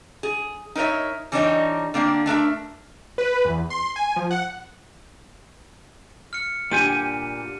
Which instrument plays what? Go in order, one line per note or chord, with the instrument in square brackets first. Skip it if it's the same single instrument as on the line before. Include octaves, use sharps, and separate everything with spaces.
[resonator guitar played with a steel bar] G#4
D#4 A#4 B4 C#5 E5
E3 G3 D4 D#4 C#5 D#5
D3 A#3 C4 D4
A3 D4 A#4 E5
[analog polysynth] B4
E2
C6
G#5
F3
F#5
[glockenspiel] F6 C#7
[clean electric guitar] A#2 G4 G#5 [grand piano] D3 G3 [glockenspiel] D#7